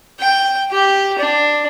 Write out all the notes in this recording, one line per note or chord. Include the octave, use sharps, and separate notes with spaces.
G5
G4
D4